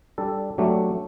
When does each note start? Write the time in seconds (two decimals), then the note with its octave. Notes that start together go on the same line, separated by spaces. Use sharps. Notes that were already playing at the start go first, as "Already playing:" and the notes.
0.18 G3 D4 A4
0.58 F#3 A3 D4 G4